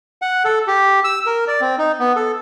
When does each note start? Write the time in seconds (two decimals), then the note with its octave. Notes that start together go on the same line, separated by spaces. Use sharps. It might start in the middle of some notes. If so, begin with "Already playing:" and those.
0.22 F#5
0.45 A4
0.68 G4
1.04 E6
1.26 A#4
1.48 D5
1.61 C4
1.78 D#4
2.00 B3
2.16 A4